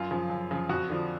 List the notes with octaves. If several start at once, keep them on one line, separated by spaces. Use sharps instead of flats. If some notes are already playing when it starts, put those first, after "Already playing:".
Already playing: F#2 F4
C#3 F3
F#2
C#3 F3
F2 F#4
D3 F3